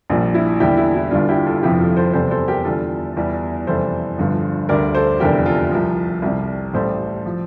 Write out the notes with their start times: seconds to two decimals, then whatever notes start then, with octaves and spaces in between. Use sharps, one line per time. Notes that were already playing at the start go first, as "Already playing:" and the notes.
0.10 A#1 A#2 G3 D4
0.34 E4
0.60 E2 D3 G3 E4 G4
0.77 E4
0.95 E4
1.11 G1 G2 D3 D4 F4
1.28 E4 G4
1.46 F4 A4
1.63 G1 F2 C3 F3 E4 G4
1.80 F4 A4
1.97 A4 C5
2.14 E2 C3 G3 A4 C5
2.31 A4 C5
2.48 G4 A#4
2.65 E2 D3 G3 F4 A4
3.17 E2 E3 G3
3.67 F1 E2 E3 G3 A4 C5
4.18 G1 G2 D3 F3
4.69 D2 D3 G3 A#4 D5
4.95 A4 C5
5.20 F1 E2 D3 G3 G4 A#4
5.46 F4 A4
5.71 C2 C3 F3
6.22 C2 C3 G3
6.74 A1 A2 G3 A4 C5
7.26 F3